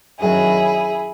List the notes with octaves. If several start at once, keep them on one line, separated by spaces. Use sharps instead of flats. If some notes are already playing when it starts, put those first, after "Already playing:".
F#2 D#3 F#3 E4 G#4